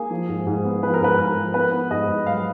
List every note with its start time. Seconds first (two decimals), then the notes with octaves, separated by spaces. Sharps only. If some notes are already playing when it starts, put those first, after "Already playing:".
Already playing: A#3 G#4
0.11 F3
0.29 G#2
0.47 G#2
0.65 B3
0.83 F3 B4
0.94 A#4
1.01 G#2 B4
1.19 G#2 A#4
1.37 F3
1.54 B3 B4
1.72 B3
1.91 G#2 D#5
2.09 G#2
2.26 F#3 F5